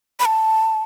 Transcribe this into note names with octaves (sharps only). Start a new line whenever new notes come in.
B5
A5